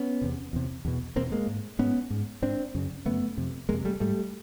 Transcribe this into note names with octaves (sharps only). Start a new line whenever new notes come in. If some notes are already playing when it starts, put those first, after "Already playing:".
Already playing: B3 C#4
E2 C3
E2 C3
E2 B2
E2 B2 A#3 C4
G#3 A#3
G#2
G#2 B3 C#4
G#2
G#2 C4 D4
F#2 C#3
F#2 C#3 A3 B3
F2 C3
F2 C3 G#3 A#3
G3 A3
G#2 G3 A3